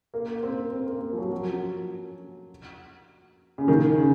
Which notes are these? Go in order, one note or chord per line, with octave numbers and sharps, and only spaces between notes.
A#3
C4
C4
A#3
F3
F#3
F#3
C#3
D#3
C#3